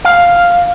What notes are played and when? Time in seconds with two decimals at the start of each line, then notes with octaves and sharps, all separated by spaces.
0.05 F5